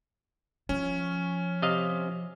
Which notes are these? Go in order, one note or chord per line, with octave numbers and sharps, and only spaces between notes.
F3 C#4
C3 D#5 F5